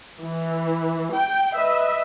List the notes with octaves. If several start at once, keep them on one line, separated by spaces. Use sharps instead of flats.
E3
G5
B4 D#5 E5